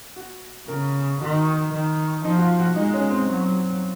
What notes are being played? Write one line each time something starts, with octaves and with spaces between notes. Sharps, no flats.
F#4
C#3 A#4
D#3 F#4
D#3
F3 D#4
F#4
F4
F#4
G#3 D#4
C#4
C4
F#3